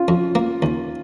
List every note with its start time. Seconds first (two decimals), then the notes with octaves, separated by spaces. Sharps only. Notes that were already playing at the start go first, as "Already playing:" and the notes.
Already playing: C#4 F4
0.08 F2
0.35 A#3
0.62 D#2